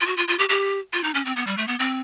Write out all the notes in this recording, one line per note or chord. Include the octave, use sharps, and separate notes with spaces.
F4
F#4
F4
F4
G4
G4
F4
D#4
C#4
C4
B3
G3
A3
B3
C4